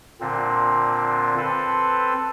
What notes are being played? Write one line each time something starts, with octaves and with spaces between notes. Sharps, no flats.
A#2 D3 C4
C4 A4 B4